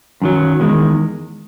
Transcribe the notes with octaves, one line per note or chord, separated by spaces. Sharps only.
F#2 D#3 F#3
E2 D#3 G#3